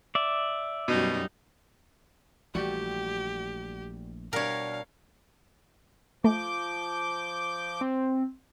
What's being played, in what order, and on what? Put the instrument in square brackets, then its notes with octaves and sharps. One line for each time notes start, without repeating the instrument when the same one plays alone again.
[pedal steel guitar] D5 E5
[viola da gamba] F#2 G3 D#4 [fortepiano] B2
[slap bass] A#1 E3 A3 [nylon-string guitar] G3 F#4 [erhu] G4
[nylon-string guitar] B2 G3 D4 [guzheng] A#4 C#5 [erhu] F5
[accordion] F3 D6 G6 [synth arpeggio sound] A3
[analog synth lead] C4